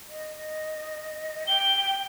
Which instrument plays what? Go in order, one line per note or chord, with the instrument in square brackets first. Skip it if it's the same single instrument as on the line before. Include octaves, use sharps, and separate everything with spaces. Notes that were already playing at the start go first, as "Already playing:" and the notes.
[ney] D#5
[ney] G5 [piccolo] G7